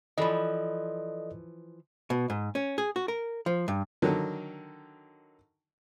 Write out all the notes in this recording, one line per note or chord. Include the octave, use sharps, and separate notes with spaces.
E3 F3 A4 D5 D#5
B2
G#2
C#4
G#4
F#4
A#4
F3
G2
D3 D#3 F#3